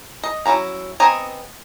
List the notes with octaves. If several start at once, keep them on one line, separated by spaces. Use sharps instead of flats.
D#5
F#3 C#4 E4 A#5
B3 C4 D#5 G#5 A#5